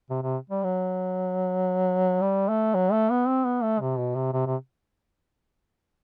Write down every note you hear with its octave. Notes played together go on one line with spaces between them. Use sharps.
C3
C3
G3
F#3
G3
A3
F#3
A3
B3
C4
B3
A3
C3
B2
C3
C3
C3